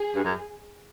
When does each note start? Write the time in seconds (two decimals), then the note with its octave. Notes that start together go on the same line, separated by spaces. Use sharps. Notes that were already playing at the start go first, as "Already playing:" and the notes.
Already playing: G#4
0.15 G2
0.24 F#2